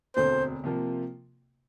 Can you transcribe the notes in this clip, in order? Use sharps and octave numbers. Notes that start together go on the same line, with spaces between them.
E1 D2 D3 A3 C4 C5
C3 F3 A#3 F4